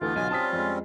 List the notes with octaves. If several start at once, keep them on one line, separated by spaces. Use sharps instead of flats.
D2 E3 A3 B3 F4 A4
B1 D3 B3 G#5
G3 C4 C#4 A5 D#6 B6
F2 G#3